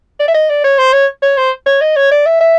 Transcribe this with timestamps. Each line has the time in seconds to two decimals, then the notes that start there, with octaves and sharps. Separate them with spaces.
0.20 D5
0.28 E5
0.34 D#5
0.49 D5
0.64 C#5
0.78 C5
0.93 C#5
1.22 C#5
1.37 C5
1.66 C#5
1.81 D#5
1.96 C#5
2.11 D5
2.26 E5
2.40 E5